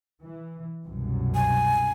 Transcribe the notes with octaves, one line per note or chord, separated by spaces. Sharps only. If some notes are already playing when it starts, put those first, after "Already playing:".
E3
C2 F#2 B2
G#5